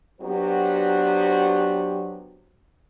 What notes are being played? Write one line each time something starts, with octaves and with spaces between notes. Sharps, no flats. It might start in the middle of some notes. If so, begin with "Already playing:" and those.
F#3 B3 D4 F#4 G4 C5